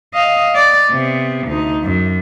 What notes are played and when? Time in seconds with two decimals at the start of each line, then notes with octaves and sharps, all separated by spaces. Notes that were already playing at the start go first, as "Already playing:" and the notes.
0.14 D#5 F5
0.55 D5
0.91 C3 B3
1.47 D2 D#4
1.83 F#2